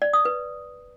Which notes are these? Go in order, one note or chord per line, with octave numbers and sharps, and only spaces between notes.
D5
D#6
B4